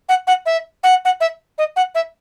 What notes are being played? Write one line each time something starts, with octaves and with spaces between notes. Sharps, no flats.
F#5
F#5
E5
F#5
F#5
E5
D#5
F#5
E5